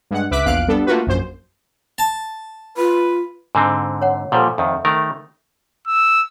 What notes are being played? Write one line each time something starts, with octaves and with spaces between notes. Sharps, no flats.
G2 G#3 F#5
C#2 B4 E5 D6 F#6 B6
A#1 E2 F5 F#6 D7
G3 B3 D4 A4
A3 A#3 F4 F#4 B4
A#1 F#2 C5
A5
F4 B4
G#2 D3 C4 G#5
C#5 F#5
A#2 F3 G3 A4 C5 F#5
F2 D#3 E5
D#3 A3 A#4
E6